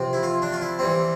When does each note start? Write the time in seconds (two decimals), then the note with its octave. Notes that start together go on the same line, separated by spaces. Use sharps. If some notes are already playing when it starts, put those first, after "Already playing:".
Already playing: C3 F3 C4
0.13 E4
0.23 F4
0.42 D4
0.52 F4
0.61 E4
0.79 E3 G3 C4